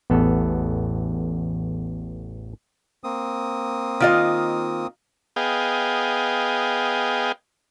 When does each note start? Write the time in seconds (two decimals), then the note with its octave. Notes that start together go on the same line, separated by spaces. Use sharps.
0.10 A1 E2 B3 A4
3.04 A#3 C4 D#6
4.00 D#3 F4 D#5
5.36 B3 G#4 D#5 F5 G5